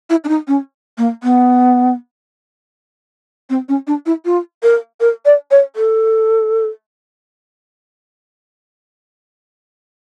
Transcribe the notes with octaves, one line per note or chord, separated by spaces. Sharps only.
E4
D4
D#4
C#4
A#3
B3
C4
C#4
D4
E4
F4
A#4
A#4
D5
C#5
A4